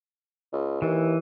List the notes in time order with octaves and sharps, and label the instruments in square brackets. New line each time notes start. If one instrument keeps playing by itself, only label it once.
[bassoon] C#2
[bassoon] D#2 [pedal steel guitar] E3